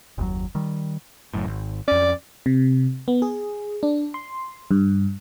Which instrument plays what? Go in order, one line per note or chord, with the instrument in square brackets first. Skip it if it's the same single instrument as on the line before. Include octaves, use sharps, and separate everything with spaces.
[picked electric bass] F#1 D#2 B2 F#3
D#3 G3
F#1 F#2 A2
G#1
[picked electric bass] F2 C#4 [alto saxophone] D5
[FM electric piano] C3
B3
G#4
D4
C6
G2